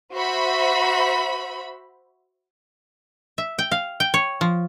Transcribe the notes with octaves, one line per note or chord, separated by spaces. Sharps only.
F#4 C5 E5 B5
E5
G5
F5
G5
C#5
F3